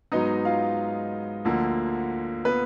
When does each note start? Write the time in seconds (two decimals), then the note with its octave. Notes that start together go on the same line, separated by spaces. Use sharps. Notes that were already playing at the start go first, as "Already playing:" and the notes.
0.12 G#2 F#3 B3 D#4 D#5
0.45 F4 F5
1.45 D2 D3 F3 A#3
2.45 B3 B4